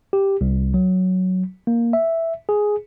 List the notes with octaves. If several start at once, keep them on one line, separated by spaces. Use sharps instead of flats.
G4
C2
F#3
A#3
E5
G#4